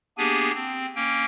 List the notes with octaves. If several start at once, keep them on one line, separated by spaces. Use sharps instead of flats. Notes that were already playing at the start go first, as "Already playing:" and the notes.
A#3 B3 D4 G4 G#4 G#5
C4
A#3 C#4 G5